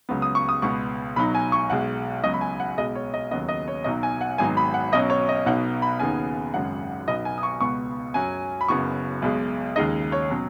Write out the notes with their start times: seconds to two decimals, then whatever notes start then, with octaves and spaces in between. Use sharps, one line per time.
0.09 C#2 C#3 F#3 B3
0.22 D#6
0.35 C#6
0.49 D#6
0.62 C#2 B2 B3 C#6
1.16 B1 B2 F#3 D#4 B5
1.35 G#5
1.52 C#6
1.70 B1 B2 G#3 F#5
2.23 C#2 B2 F#3 C#4 D#5
2.34 B5
2.41 G#5
2.60 F#5
2.78 B1 B2 G#3 D#5
2.95 C#5
3.14 D#5
3.31 D#2 C#3 F#3 B3 D#5
3.49 D#5
3.68 C#5
3.84 B1 B2 F#3 D#4 D#5
4.03 G#5
4.21 F#5
4.38 G#1 G#2 F#3 B3 D#4 G#5
4.57 B5
4.74 F#5
4.92 B1 B2 F#3 C#4 D#5
5.10 C#5
5.29 D#5
5.46 B1 B2 B3 D#4 F#5
5.82 B5
6.00 D#2 C#3 B3 D#4 G#5
6.53 G#1 F#2 C#3 G#3 F#5
7.07 B1 B2 B3 D#4 D#5
7.25 G#5
7.38 D#6
7.43 C#6
7.61 C#2 B2 B3 C#6
8.14 F#2 F#3 C#4 G#5
8.61 B5
8.68 F#1 F#2 C#3 B3 C#6
9.22 B1 B2 G#3
9.76 D#2 C#3 G#3 D#4 D#5
10.12 C#5
10.30 B2 F#3 C#4